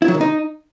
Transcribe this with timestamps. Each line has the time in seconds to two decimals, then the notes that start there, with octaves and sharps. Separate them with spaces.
0.02 E4
0.08 F#3
0.15 D#3
0.21 D#4